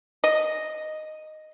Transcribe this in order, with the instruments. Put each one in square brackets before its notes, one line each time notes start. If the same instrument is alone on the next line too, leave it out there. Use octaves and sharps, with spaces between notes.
[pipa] D#5